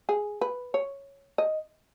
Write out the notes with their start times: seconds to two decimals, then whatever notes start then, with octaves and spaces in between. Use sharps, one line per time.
0.09 G#4
0.41 B4
0.74 C#5
1.38 D#5